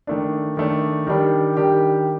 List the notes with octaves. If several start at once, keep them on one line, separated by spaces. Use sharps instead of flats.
D#3 A3 D4
D#3 A3 D4
D#3 G3 D4 G4
D#3 G3 D4 G4